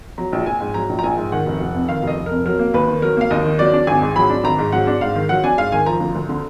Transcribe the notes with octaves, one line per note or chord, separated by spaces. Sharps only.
F#3 A#5
A#1
A#1 G#5
G#2
F#3 A#5
A#1
A#5
A#1 G#5
G#2
D#3 F#5
F1
F1
F2
D#3 F5
F1 D#5
F1
F2 A#4
F#3 A#4
A#3
D#2 B4
D#3
F#3 A#4
A#3 F5
D#2 D#5
D#3
F#3 D5
D4
G#1 G#5
G#2
F#3 B5
D4
G#1 A#5
G#2
F#3 F#5
D4
G#2 F5
D#3
F#3 F#5
D4 G#5
G#2 F5
D#3 G#5
F3 A#5
D2
D2
D3